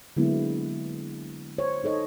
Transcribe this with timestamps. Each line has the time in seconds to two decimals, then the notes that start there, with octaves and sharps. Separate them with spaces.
0.17 D3 F#3 G#3 A#3 B3 E4
1.58 C5 C#5
1.84 D#4 A4 C#5 D#5